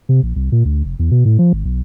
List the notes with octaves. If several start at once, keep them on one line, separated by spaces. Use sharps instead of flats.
C3
A#1
C2
A#2
D2
F1
E2
B2
A2
F3
G#1
B1